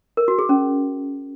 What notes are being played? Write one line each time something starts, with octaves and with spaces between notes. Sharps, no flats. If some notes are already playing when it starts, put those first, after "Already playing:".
A#4
F#4
G#4
C#4